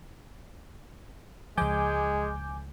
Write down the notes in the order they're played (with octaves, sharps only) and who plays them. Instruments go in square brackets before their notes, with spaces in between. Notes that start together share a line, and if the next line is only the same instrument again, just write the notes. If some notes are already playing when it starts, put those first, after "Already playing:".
[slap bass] C#2 F3 [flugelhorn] G#3 [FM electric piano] G#5 D6 G6